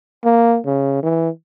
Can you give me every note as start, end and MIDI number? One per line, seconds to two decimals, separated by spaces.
0.25 0.59 58
0.66 0.98 49
1.03 1.29 52